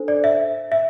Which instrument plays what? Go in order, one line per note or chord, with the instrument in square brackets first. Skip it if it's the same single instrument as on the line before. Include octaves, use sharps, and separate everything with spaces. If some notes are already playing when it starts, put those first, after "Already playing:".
Already playing: [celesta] D4 A4 C5
D5
E5
E5